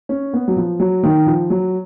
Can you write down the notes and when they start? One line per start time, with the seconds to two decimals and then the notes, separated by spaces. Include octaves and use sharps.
0.09 C#4
0.33 B3
0.48 F#3
0.56 F3
0.80 F#3
1.03 D#3
1.26 F3
1.50 F#3